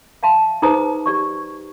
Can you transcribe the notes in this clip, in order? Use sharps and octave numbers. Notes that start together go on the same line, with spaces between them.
E5 F5 A5 C6
D#4 G#4 B4 C5 A#5 D#6
G4 D5 C#6